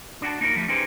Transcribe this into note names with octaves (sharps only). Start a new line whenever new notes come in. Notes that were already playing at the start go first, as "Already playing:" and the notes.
D4 F#4 G5 A5
A#3 D#4 F4 F#4 A#4
D3 F3 G3 A3 A#3
C#4 D#4 G4 G#4 B4 C5